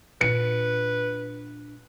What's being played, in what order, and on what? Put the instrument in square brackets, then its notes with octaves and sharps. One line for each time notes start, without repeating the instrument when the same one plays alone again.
[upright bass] A#2 D4 [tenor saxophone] B4 [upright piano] C#7